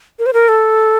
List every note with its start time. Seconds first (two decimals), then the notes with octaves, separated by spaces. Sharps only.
0.19 A#4
0.26 C5
0.34 A#4
0.49 A4